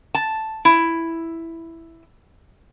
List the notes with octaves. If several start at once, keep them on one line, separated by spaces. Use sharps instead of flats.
A5
E4